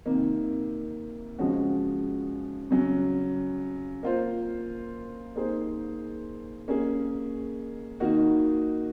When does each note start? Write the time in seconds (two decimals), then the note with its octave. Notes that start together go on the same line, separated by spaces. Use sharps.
0.06 C3 D#3 A#3
1.38 C#3 F3 G#3 C#4 F#4
2.70 C#3 F#3 C#4
4.03 A#3 F4 C5
5.36 A#3 D#4 G#4 C5
6.68 A#3 C#4 G#4
8.00 D#3 A#3 D#4 F#4